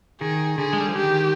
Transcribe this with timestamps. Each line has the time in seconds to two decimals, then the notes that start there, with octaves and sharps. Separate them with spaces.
0.21 D#3 G#4
0.58 D3 G#4
0.73 G#3
0.80 G3
0.88 F3
0.95 D#3 G4